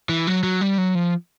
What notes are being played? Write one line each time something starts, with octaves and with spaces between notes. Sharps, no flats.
E3
F#3
F#3
G3
F#3
F3